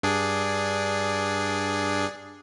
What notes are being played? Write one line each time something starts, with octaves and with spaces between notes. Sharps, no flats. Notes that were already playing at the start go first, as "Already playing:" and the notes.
G2 D4 G#4